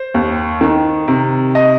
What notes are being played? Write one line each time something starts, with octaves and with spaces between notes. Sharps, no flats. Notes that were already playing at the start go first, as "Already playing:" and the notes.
Already playing: C5
D#2
D#3
C3
D#5